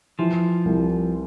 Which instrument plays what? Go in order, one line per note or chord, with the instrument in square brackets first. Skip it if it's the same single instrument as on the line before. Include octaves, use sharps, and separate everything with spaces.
[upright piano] E3 [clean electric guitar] F3
[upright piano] C2